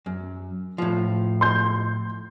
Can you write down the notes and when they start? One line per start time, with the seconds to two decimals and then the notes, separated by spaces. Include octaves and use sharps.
0.06 F#2
0.78 A2 F3
1.41 C6 G6